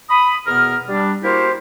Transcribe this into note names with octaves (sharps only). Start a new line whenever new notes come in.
B5 D#6
E2 B2 B3 A#4 F6
G3 D4
A#3 E4 F#4 G4 A#4 C5